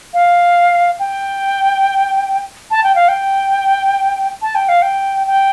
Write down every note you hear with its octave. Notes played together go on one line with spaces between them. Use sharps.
F5
G5
A5
G5
F5
G5
A5
G5
F5
G5
G5